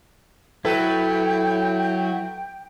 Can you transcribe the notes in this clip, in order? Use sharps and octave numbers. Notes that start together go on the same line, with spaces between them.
F#3 E4 A4 B4 G5